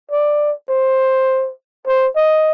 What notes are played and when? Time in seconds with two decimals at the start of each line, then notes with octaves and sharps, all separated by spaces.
0.11 D5
0.69 C5
1.88 C5
2.16 D#5